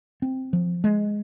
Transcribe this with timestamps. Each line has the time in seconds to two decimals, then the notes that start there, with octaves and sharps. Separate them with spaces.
0.22 C4
0.53 F3
0.84 G#3